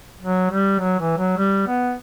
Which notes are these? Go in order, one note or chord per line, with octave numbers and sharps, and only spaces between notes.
F#3
G3
F#3
E3
F#3
G3
B3